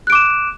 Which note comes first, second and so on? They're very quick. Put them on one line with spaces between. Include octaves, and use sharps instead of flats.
F#6 D7 D6 E7